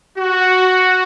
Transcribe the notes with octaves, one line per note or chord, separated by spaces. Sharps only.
F#4